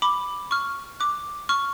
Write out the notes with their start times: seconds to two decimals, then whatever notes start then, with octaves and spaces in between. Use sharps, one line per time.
0.02 B5 D6
0.51 C#6 F6
1.00 D6 F#6
1.49 C#6 F6